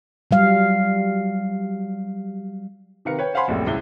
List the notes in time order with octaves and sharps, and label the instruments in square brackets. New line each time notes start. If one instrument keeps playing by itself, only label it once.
[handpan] F#3 G3 F5
[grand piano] C3 D#3 A#4 B4 F5 C#7
B4 C#5 G5
C5 F5 F#5 G#5 B5 C6
F#1 C2 F2 A2
C#2 E4 G7